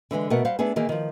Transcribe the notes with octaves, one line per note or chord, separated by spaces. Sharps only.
D3 E3 F3 G#3
B2 A3 B3 A#4 F#5
G3 C5 F5 F#5
A3 B3 D4 G#4
D#3 E3 A#3 G#4
D#3 F3